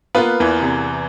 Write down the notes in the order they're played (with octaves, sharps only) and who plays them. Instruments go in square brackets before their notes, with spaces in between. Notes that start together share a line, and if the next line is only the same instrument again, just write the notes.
[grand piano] A#3 B3 [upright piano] F4 B4
[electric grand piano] E2 E3
[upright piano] C3